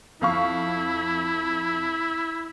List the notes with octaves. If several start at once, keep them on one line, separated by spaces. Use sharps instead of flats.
F2 E4 F5 C#6